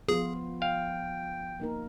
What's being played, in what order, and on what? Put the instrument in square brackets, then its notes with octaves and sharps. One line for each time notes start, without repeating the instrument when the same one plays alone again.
[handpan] F3 B3 F4 [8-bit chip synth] G#4
[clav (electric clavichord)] F5 [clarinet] G5
[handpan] A#3 D#4 A#4